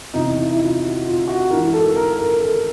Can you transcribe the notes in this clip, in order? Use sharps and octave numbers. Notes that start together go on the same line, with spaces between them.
E2 C3 E3 D#4
E4
E4
F4
F#4
F4
F#4
G#2 E3 A#4
A4
A#4
A#4
A4